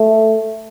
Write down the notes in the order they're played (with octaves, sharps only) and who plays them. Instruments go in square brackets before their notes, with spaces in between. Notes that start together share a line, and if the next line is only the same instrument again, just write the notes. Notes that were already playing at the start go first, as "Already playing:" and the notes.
Already playing: [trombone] A3